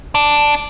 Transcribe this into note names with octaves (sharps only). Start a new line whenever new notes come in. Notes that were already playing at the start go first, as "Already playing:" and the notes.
D4